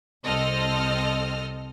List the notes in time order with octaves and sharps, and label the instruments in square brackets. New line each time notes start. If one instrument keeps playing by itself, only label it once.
[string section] C2 C4 A4 D#5 F6